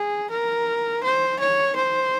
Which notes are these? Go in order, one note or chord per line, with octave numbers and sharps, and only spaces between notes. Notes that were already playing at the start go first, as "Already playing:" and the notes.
Already playing: G#4
A#4
C5
C#5
C5